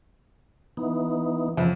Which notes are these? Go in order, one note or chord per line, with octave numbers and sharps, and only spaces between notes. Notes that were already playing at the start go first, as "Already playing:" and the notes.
E3 B3 D#4
F2 C#3 E5